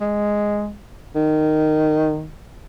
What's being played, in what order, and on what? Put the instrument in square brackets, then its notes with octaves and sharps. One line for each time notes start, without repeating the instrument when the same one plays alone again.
[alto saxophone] G#3
D#3